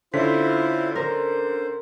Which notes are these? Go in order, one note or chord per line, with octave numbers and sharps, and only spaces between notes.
D3 C#4 E4 F4 C5 B6
A#4 C5